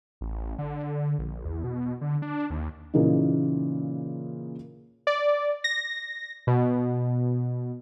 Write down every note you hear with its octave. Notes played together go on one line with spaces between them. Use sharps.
A1
D3
A#1
E2
B2
D3
D4
D#2
A#2 C#3 E3 A#3 D#4
D5
A#6
B2